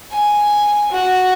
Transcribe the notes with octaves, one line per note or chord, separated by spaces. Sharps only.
G#5
F#4